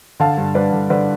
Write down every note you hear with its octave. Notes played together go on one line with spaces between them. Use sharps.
D3 F5 A5
G2
G2 B4 D5
D3
D3 B4 D5